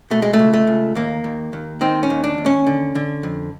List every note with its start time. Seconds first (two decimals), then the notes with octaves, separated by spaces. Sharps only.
0.11 B2 A3
0.22 G#3
0.33 A3
0.39 C#2
0.53 A3
0.67 C#2
0.95 D#2 A#3
1.24 D#2
1.53 D#2
1.81 D#3 C4
2.03 C#4
2.10 D#2
2.24 D4
2.38 D#2
2.46 C#4
2.67 D3
2.95 D3
3.23 F2